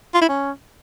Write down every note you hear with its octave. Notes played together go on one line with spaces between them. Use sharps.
F4
E4
C#4